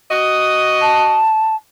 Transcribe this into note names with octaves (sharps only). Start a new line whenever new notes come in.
F#4 D#5
A5